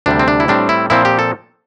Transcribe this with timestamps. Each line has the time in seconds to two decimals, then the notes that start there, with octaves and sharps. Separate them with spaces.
0.06 D2 C3 G3 D4
0.19 C4
0.28 D4
0.40 E4
0.48 A2 G3 C4 D4
0.69 E4
0.90 A#2 F3 C4 E4
1.05 G4
1.19 A4